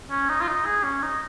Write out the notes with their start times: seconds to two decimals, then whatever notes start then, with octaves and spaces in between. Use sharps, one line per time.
0.10 C#4
0.29 D#4
0.41 F4
0.48 D#4
0.65 G#4
0.84 C#4
1.02 D#4